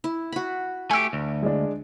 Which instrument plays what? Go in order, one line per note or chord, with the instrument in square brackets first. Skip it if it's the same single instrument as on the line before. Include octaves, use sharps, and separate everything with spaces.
[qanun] E4
F#4 B5
[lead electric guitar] A3 G4 [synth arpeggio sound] G#5 E6
[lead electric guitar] D2
[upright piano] G#3 D4